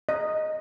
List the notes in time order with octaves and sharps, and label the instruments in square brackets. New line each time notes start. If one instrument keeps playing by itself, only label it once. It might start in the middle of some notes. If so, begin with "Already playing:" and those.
[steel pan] D#5